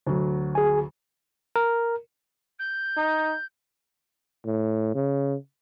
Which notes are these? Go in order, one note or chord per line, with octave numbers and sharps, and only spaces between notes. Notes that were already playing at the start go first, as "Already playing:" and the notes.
D2 F#3
G#4 G#5
A#4
G6
D#4
A2
C#3